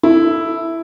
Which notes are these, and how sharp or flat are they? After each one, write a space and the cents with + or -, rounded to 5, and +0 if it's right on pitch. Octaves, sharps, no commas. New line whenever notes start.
E4 +0 A4 +10